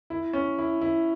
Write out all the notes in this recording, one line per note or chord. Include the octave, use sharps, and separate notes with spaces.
E4
C#4
E4
E4